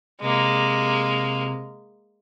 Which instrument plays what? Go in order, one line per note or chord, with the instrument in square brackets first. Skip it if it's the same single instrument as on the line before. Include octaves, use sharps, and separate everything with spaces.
[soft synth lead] C3 [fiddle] G#3 A#3